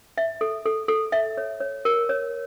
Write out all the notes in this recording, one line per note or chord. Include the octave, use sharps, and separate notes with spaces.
E5
A4
A4
A4
E5
C#5
C#5
A#4
C#5